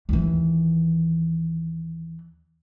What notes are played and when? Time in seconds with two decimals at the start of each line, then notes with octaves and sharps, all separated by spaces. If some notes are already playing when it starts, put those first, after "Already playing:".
0.09 D#2 E3